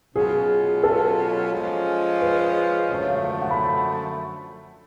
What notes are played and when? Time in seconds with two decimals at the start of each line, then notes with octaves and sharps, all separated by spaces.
0.15 B2 F#3 C#4 F4 G#4
0.83 A4
1.52 F3 G#3 C#4 F4
2.21 B4
2.90 F#2 D3 F3 A3 C#5
3.08 F5
3.24 F5
3.42 F#5
3.51 B5